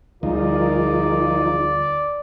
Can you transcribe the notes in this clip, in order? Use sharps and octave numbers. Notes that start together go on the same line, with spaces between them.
D2 F3 G3 D#4 F4 G#4 A#4 D5